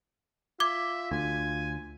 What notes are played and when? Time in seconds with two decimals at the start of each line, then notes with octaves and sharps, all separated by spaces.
0.60 F4 E5 D6 G#6
1.11 D2 G#5